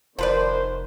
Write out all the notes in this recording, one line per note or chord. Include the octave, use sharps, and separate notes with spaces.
F1 D#3 F3 B4 C5 D5